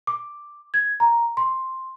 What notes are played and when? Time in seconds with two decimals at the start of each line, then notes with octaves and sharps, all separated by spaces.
0.07 D6
0.74 G#6
1.00 A#5
1.37 C6